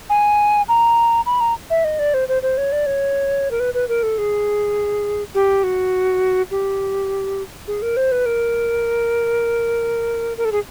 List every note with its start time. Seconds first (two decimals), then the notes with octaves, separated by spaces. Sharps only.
0.10 G#5
0.69 A#5
1.26 B5
1.40 A#5
1.70 E5
1.84 D#5
1.99 D5
2.14 C5
2.28 C5
2.42 C5
2.57 C#5
2.72 D5
2.86 C#5
3.51 A#4
3.60 B4
3.74 B4
3.89 A#4
4.03 A4
4.18 G#4
5.35 G4
5.63 F#4
6.51 G4
7.68 G#4
7.82 A#4
7.97 C5
8.12 B4
8.26 A#4
10.37 A#4
10.45 A4
10.52 G#4